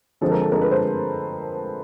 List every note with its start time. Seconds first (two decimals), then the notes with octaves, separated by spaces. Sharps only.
0.21 D3 F3 G#3 C4 A4
0.32 A#4
0.41 A4
0.52 D3 F3 G#3 C4 A#4
0.61 B4
0.71 C5